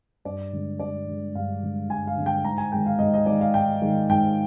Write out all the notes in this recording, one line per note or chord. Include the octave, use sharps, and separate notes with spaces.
G2 D5
D3 G#3
G2 D5
D3 G#3
G2 F5
D3 G#3
G2 G#5
F5
D3 G#3
G5
G#2 A#5
G#5
D#3 G#3 G5
F5
G#2 D#5
D#5
D#3 G#3 D5
F5
G#2 G5
D#3 G#3
G#2 G5